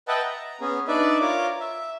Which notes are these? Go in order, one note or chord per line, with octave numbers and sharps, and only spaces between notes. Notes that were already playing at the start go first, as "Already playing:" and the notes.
B4 D#5 E5 F#5 G5 A5
A#5
B3 C#4 G#4
D4 D#4 B4 D5 E5
F4 A#4 C#5 D6
E5